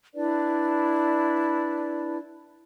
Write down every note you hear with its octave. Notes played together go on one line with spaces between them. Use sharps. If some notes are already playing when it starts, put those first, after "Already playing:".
D4 E4 B4 D5